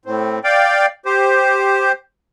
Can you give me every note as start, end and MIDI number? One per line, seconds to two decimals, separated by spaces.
0.05 0.39 45
0.05 0.39 60
0.44 0.86 74
0.44 0.86 77
0.44 0.86 79
1.06 1.92 67
1.06 1.92 72